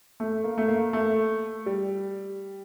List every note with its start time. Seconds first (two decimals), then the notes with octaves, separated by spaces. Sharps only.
0.20 A3
0.44 A#3
0.58 A3
0.68 A#3
0.93 A3
1.66 G3